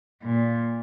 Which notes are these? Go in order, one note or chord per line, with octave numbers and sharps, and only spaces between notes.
A#2